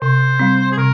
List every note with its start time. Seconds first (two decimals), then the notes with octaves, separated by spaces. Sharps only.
0.02 C3 C5
0.40 G3 C4
0.72 G#4
0.78 C3 A#4